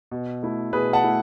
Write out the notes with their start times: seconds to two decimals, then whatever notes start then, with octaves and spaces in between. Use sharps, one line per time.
0.11 B2
0.43 A3 E4
0.73 B2 G#4 B4
0.93 F#5 A5
1.04 A3 E4